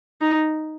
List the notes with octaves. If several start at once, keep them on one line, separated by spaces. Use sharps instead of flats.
D#4